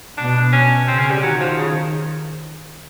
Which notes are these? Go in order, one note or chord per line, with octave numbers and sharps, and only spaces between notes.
B2 D4
C#4
C#3 C4
C#4
G3
D#3 F#3
F3
C#3